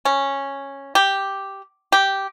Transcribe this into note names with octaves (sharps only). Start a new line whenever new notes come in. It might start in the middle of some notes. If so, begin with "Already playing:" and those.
C#4
G4
G4